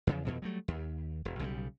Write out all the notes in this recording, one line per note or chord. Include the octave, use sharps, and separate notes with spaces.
E2 C#3 F3
F2 B2 E3
F#3 G3 A3
D#2
E1
B1 C#3 E3 G3